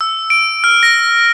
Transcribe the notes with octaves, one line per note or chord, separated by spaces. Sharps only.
E6
D7
F6
A#6